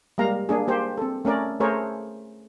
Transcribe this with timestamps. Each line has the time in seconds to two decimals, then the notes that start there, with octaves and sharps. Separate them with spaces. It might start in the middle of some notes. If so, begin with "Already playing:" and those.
0.18 G3 G#3 A#3 F5 A#5
0.49 A#3 D4 G#4
0.67 A#3 G4 C5
0.98 C4 A4
1.25 A3 C#4 A#4 D5
1.60 A3 G#4 A#4 C5 C#5